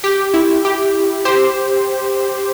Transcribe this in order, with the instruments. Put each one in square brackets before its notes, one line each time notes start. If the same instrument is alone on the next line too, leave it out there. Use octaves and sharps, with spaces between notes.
[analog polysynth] G4
E4
G4
G4 C5